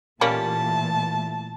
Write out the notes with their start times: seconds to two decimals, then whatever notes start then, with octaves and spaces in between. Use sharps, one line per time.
0.21 A#2 E3 G3 A3 A#3 C#4 A5